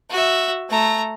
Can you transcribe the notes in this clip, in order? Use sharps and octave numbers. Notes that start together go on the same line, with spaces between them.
F#4 E5
A3 A#5